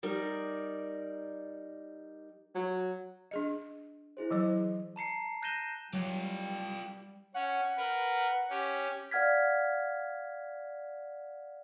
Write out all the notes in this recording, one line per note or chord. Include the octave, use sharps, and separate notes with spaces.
G3 D#4 A#4 D5
F#3
D4 G#4 D#5
E4 G#4 C5
E3 F#3 C5 D#5
A5 A#5 C7 C#7
F#6 G6 A#6 D#7 E7 G7
F#3 G3 F4 G4
C#4 F#5
A#4 B4
C#4 G4
D5 F5 F#5 F6 G#6 B6